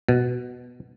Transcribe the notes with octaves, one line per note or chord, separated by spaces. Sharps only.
B2